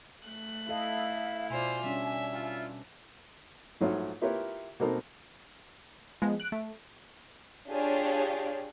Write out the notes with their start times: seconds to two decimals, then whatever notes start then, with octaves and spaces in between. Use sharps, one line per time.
0.25 A3 F#6
0.69 E4 A4 D#5 F5
1.50 B2 F4 C5 D5 G#5
1.84 G3 C#4 D4 E5
2.33 E4 F4
3.81 A#1 G#2 F#3 A3 F4 C#5
4.22 E4 F4 G4 A#4 B4 C#5
4.80 B2 A#3 C4 D#4 A4 A#4
6.22 F3 G#3 B3
6.40 F#6 D7
6.52 A3
7.69 D4 F4 G4 G#4 C#5 D5